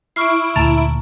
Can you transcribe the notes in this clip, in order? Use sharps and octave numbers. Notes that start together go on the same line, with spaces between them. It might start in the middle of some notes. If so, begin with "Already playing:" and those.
E4 C#6 F6 C7 D7
D2 A#2 A5 A#5 A6